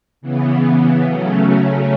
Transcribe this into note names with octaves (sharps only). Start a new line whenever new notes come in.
C#3 E3 B3
C#3 F#3 A3 C#4